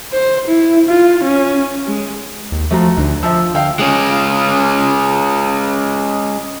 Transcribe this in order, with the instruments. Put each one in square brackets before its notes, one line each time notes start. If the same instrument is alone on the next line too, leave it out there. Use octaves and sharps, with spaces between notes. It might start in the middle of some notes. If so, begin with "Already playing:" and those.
[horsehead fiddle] C5
E4
F4
C#4
G#3
[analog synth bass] D#2
[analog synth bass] F3 [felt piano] A3 F#4 A#5
[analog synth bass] D2 [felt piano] D3
[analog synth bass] F3 [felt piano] E5 A5 E6
[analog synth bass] D2 [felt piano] F5 G5 E6
[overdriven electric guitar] G#3 C#4